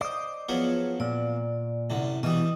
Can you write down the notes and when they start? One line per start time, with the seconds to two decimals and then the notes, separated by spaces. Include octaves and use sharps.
0.01 C5 D5 D#5
0.49 F3 F#3 B3 F4 G#4 C#5
1.00 A#2 D5
1.90 C2 F#2 D3
2.23 B2 E3 G3 D#5 D#6